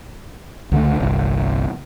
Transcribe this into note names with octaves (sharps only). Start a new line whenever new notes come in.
C#2 D3 A3
G1 C2